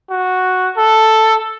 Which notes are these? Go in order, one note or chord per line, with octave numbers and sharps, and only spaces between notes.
F#4
A4